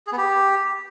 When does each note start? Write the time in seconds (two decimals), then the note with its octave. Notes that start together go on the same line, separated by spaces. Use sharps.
0.07 G#4
0.12 B3
0.18 G4